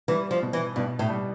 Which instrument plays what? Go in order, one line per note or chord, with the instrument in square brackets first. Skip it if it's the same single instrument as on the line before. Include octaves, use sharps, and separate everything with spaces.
[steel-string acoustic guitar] E3 [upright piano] G3
[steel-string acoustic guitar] F3
[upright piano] B2
[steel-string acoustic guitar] E3
[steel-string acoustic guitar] G2 [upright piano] B2
[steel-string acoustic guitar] A2
[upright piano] G3